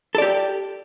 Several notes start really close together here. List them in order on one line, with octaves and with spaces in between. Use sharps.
A4 D5 G4